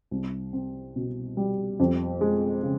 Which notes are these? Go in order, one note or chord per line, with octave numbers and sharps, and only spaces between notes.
C2
C4
B2
G3
F2
G#3
C#3